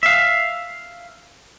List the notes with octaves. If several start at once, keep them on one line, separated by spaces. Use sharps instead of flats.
E5 F5